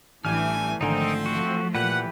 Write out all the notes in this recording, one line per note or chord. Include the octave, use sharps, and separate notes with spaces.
A1 E3 G3 A3 D4 G#5 F6
G#1 D3 F3 A3 C4 D#4 A#4 G#5
F#4
A#2 E3 G4 B4 F#5